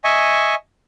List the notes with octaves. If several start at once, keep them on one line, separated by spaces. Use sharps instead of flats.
D#5 E5 G#5 C#6